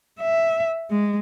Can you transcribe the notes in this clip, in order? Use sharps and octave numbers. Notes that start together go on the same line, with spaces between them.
E5
G#3